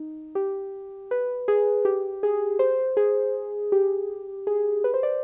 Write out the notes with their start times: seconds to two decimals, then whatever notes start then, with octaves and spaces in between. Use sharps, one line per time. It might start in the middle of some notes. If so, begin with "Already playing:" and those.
Already playing: D#4
0.35 G4
1.11 B4
1.48 G#4
1.85 G4
2.23 G#4
2.59 C5
2.97 G#4
3.72 G4
4.47 G#4
4.84 B4
4.94 C5
5.03 D5